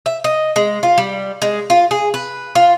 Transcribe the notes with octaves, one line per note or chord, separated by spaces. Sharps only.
E5
D#5
G#3
F4
G3
G#3
F4
G#4
B4
F4